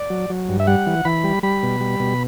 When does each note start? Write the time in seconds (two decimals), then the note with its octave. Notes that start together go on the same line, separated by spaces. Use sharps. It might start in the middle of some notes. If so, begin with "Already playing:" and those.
Already playing: D5
0.10 F#3
0.30 F#3
0.49 G2
0.60 E5
0.67 G3 F#5
0.87 E3
1.05 E3 B5
1.24 G3
1.43 G3 B5
1.63 B2
1.81 G3
2.00 B2